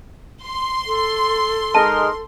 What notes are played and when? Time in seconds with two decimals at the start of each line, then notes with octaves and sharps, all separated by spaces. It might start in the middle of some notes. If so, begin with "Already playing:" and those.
0.43 C6
0.86 A4
1.75 G#3 D#4 A#4 A5